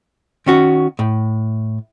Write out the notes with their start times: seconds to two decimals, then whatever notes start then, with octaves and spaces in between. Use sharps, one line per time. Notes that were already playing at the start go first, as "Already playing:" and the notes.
0.46 D#3 C#4 F#4
0.99 A2